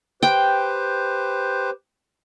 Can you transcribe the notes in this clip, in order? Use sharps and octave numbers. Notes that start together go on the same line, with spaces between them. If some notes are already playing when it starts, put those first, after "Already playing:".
G4 B4 C5 G5